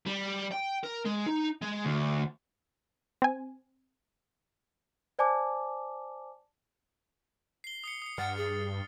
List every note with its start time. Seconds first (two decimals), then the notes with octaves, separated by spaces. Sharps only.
0.07 G3
0.52 G5
0.84 A#4
1.05 G#3
1.26 D#4
1.62 G#3
1.85 D2
3.22 C4 G#5
5.19 C5 D5 G#5 A5 D6
7.64 C7 G7
7.84 D#6 C7 C#7
8.02 D#6 C#7
8.18 G2 F#5 F6 A6
8.37 G#4